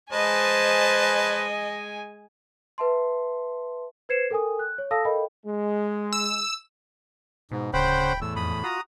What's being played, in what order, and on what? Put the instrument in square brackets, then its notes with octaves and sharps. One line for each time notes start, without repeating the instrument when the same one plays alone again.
[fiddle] G#3 G#5 [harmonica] B4 A5 [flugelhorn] C5 [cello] D#5
[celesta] B4 E5 A5 C6
B4 C5 G#6 C7 C#7 E7
A4 A#4 G5 G#5 D#6
F#6
C#5
A4 F5 A5 D#6 E6 A#6
A4 A#4 D#5 F5 G5 B5
[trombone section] G#3
[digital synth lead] E6
[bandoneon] G#2 [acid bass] B2
[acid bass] D1 [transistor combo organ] C#3 F#5 [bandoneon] C5 [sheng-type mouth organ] G5 B5
[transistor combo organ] E2 A2 [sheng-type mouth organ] E6
[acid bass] F2 [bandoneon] B5 [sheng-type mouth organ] D#6
[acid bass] F4 [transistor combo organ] F#4 [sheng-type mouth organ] A#5 D#6